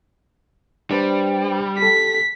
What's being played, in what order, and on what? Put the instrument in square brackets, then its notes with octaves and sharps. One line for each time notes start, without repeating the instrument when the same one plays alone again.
[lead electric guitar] G3 [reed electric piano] D4 B4 C5
[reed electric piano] G4 A4 [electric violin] B6